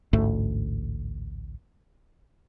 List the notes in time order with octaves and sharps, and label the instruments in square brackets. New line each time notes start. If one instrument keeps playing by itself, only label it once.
[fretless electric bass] A1 D2 G#2 A3